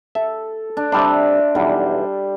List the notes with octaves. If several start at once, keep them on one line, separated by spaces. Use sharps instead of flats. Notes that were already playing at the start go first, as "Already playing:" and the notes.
A4 E5
D4
C3 G3 D4 D5 E5 C6
B1 E2 G3